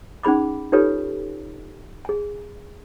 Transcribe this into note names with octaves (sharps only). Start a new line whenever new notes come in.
C#4 D#4 G#4 B5 D6
D#4 F4 G4 A4 B4 C#5
G#4 G#5